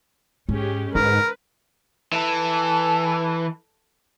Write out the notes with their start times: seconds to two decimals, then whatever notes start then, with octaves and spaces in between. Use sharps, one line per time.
0.49 G#2 G#3 C#4 G4
0.95 G#2 D3 A#4 B4
2.13 E3 A4